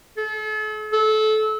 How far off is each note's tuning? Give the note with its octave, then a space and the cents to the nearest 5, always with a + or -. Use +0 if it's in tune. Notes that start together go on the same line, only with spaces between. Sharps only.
A4 -40
A4 -25